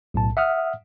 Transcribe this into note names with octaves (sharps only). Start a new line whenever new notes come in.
B1 A2 A5
E5 F#5 D#6 F6